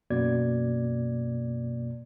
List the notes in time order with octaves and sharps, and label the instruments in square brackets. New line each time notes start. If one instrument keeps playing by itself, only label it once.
[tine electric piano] F#2 B2 A#3 D5 G#6